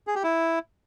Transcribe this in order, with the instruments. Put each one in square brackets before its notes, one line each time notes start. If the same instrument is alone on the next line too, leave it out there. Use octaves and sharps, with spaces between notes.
[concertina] G#4
G4
E4